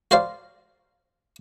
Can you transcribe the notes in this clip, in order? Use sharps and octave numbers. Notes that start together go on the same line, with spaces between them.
F#4 A#4 C5 D5 F5